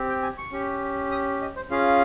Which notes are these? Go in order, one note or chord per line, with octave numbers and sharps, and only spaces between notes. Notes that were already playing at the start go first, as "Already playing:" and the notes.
Already playing: C4 G4
G5
G#5
C#6
C#4 G4
D#6
D#5
C5
C#4 F4 G#4 F5